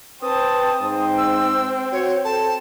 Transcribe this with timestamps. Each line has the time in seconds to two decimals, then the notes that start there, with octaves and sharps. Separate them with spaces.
0.22 C4 B4 A5 D#6
0.82 G#2 C4
1.18 E6
1.92 F#4 C#5
2.25 A4 A5